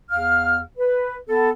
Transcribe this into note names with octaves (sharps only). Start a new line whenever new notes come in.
E2 F5 F6
B4
B3 A4